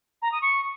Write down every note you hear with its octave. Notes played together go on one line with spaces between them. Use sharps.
A#5
D#6
C#6